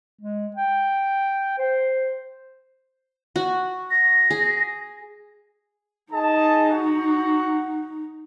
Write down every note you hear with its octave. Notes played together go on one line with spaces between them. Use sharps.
G#3
G5
C5
F#4
A#6
G#4
D#4 G#4 D#5 A5
F#4 F#5